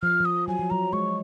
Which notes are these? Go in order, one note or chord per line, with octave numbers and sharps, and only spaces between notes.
F3 F6
F3
D#6
F#3 G#5
F3
F#3 A#5
G#3 C#6